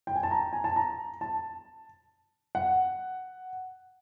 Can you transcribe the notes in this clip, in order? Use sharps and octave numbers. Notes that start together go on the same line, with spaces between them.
G5
G#5
A5
A#5
G#5
A5
A#5
A5
F#5